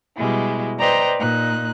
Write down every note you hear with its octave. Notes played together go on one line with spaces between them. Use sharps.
B2 G3 G#3 E4
B4 C5 D5 D#5 G5 A#5
A#2 D#4 F#6